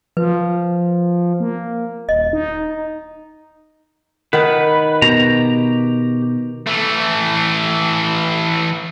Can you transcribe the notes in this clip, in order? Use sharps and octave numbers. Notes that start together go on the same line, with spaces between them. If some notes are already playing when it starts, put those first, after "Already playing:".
F3 B4
A#3
D#1 D#5
D#4
D#3 B4 F#5
B2 G4 A#5
E3 A3